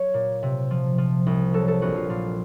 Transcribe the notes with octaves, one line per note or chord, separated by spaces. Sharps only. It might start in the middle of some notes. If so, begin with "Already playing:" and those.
Already playing: F#3 C#5
A#2
C3
F3
F3
C2
F#3 A4
A4
A#1 F#4
F4
A#2 F4